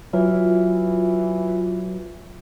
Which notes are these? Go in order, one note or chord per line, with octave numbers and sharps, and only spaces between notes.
E3 F#3 F4